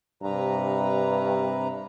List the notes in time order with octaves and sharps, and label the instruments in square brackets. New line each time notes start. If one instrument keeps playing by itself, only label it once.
[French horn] G2 [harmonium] C3 B4 A#5